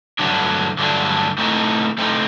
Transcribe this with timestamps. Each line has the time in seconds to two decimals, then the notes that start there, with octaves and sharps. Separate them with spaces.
0.19 G2 D3 F#3 A3 D4
0.79 G2 D3 F#3 A3 D4
1.38 A2 A3 C4 D#4
1.98 A2 A3 C4 D#4